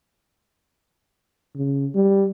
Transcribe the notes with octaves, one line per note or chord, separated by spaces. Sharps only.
C#3
G3